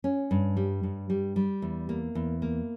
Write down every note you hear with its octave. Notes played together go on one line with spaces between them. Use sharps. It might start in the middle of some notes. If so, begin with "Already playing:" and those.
C#4
G2
G3
G2
G3
G3
E2
A#3
E2
A#3